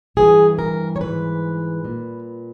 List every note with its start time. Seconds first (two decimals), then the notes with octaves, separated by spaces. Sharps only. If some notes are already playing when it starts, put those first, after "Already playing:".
0.17 G2 E3 G#4
0.59 A#4
0.96 C#5
1.00 G#2 E3 B4
1.85 A#2